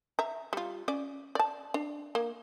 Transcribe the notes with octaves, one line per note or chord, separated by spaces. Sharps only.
E5 A#5
G3 F4
C#4 D5
D5 A5
D4
A#3